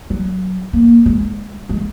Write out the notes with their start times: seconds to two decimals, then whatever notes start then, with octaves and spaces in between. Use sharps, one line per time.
0.10 F#3
0.73 A#3
1.06 G#3
1.69 G#3